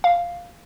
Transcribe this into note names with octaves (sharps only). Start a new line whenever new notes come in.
F5